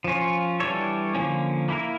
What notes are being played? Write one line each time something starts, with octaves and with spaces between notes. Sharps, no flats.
F3 C#4 F4
E3 G3 D4 A4 C#5
D3 F3 A#3 C#4
A#3 E4 A#4